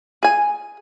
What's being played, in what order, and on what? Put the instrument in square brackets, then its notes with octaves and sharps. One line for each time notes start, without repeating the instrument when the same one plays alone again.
[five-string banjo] G#4 G#5